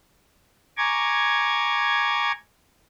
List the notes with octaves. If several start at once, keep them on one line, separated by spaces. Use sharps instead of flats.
G#5 A#5 C#6 D6 G#6